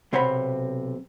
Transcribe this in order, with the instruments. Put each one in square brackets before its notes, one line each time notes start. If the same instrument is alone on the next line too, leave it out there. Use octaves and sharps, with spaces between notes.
[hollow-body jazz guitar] B1 C3 C5 C#5 F#5 B5